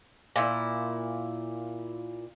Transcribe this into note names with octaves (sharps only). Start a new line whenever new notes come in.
A#2 E4